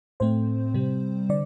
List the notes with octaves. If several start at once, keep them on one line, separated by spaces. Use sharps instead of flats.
A2 A3 C4 C5
C3 G3 C4
D3 D5